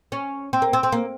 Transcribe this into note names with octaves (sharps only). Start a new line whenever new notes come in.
C#4
C4
A#3
C4
C4
A#3